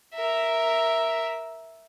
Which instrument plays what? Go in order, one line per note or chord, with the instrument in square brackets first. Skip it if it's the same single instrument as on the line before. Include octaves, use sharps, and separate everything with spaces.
[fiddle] A#4 E5